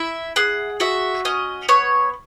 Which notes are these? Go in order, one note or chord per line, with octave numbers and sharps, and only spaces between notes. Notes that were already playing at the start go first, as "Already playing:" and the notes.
Already playing: E4 E5
G#4 F#5
F#4 E5
C#4 D#5
B3 C#5